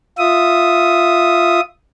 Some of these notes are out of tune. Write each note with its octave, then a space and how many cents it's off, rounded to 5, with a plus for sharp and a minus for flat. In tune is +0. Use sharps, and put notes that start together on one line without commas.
F4 +0 E5 +0 D#6 +0